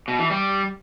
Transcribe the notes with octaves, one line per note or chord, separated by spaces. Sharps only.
B2
E3
G3